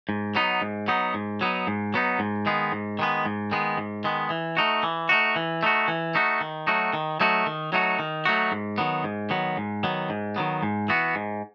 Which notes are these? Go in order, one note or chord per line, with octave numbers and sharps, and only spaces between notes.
G#2
F#3 B3 D#4
G#2
F#3 B3 D#4
G#2
F#3 B3 D#4
G#2
F#3 B3 D#4
G#2
D#3 G#3 B3
G#2
D#3 G#3 B3
G#2
D#3 G#3 B3
G#2
D#3 G#3 B3
E3
A3 D#4 F#4
E3
A3 D#4 F#4
E3
A3 D#4 F#4
E3
A3 D#4 F#4
D#3
F#3 A3 D#4 F#4
D#3
F#3 A3 D#4 F#4
D#3
F#3 A3 D#4 F#4
D#3
F#3 A3 D#4 F#4
G#2
D#3 F#3 B3
G#2
D#3 F#3 B3
G#2
D#3 F#3 B3
G#2
D#3 F#3 B3
G#2
E3 B3 F#4
G#2